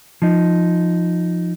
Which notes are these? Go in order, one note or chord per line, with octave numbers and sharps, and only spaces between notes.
F3 D#4